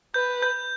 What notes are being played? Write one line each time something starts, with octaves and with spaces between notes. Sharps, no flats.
B4 G6
G6